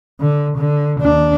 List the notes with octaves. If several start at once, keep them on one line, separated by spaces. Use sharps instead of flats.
D3
D3
D#2 D4